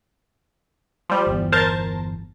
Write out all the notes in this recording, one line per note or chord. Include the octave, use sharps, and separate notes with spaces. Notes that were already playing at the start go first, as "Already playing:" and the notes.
F3 G3
G1 E2
A#4 C5 A5